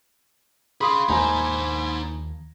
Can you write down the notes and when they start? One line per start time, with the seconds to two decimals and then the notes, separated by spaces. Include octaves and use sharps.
0.81 G#4 F5 B5 C6 D#6
1.09 D#2 F3 A#3 D#4 C5 G#5 A#5